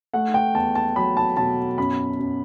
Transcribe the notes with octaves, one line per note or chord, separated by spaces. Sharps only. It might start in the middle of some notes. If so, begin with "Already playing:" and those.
A3 F#5
G5
E2 A5
A5
F#3 B5
A5
B2 A5
F#2 B5
F#2